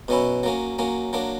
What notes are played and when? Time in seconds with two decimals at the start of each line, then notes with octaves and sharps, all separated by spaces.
0.08 B2 F#3 C#4 E4
0.43 F#3 A#3 C#4
0.79 F#3 A#3 C#4
1.13 F#3 A#3 D4